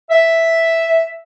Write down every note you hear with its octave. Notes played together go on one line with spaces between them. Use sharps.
E5